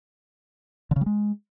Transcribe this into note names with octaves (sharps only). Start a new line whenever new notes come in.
D3
C#3
G3
G#3